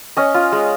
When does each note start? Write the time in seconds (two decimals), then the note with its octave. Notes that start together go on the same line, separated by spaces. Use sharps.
0.17 C#4 D#5
0.34 F4
0.52 G#3